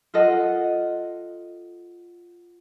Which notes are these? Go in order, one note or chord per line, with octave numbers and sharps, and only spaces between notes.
F4 A4 D#5 F#5